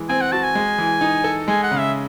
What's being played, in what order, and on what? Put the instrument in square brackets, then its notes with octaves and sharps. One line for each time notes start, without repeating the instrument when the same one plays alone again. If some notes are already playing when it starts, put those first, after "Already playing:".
Already playing: [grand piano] E3 G#3
[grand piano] C4 [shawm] G#5
[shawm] F#5
[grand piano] F#4 [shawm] A5
[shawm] G#5
[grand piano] G#3
E3
D#4
A4
[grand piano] G#3 [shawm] G#5
[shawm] F#5
[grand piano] C#3
[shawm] E5